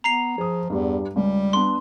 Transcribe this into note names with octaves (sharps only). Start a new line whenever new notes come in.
B3 A#5 C7 F7
F3 G#4 D#6
E2 G2 G3
C#2 G3
B3 D4 C6